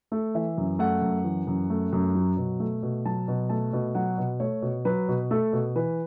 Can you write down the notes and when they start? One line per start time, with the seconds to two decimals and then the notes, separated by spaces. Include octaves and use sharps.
0.12 A3
0.35 E3 E5
0.57 F#2
0.79 A3 F#5
1.01 F#2
1.24 E3
1.47 F#2
1.70 A3
1.93 F#2
2.15 F#3
2.37 B2
2.60 A3
2.83 B2
3.05 F#3 A5
3.28 B2
3.49 A3 A5
3.73 B2
3.95 F#3 F#5
4.18 B2
4.40 A3 C#5
4.62 B2
4.85 F#3 B4
5.08 B2
5.31 A3 A4
5.53 B2
5.76 E3 B4